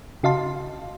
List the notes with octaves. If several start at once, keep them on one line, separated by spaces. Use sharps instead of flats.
C#3 F#4 D#5 F5 A5 C6